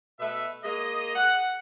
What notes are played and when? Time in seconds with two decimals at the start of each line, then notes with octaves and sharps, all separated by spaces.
0.19 B2 A3 B4 E5
0.63 G#3 A#3 D#5
1.16 F#5